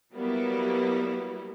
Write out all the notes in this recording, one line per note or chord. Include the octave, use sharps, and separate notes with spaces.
F#3 G3 A#3 B3 E4